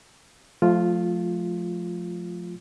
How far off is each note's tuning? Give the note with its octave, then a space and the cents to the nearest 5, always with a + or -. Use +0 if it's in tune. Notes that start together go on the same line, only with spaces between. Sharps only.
F3 +25 A3 -20 F4 +0